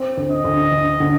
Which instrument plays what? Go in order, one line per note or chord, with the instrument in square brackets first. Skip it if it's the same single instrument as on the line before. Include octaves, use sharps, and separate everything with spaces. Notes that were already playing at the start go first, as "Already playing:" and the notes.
Already playing: [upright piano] C4
D2
[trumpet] D#5
[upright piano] D2
D2
D3